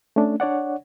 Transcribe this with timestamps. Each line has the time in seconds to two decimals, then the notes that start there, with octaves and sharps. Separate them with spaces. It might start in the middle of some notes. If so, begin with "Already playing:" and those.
0.16 A3 C#4 D4
0.40 D4 C#5 D5 F#5